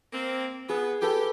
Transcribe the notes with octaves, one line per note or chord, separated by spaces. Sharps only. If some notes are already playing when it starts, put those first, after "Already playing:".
A#3 C4
B3 G#4
G4 A4 B4